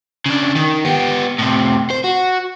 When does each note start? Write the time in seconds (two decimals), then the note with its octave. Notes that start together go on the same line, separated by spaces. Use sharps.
0.26 C#3 D4
0.56 D#3
0.85 B3 G4
1.38 A2 C3
1.90 C5
2.04 F#4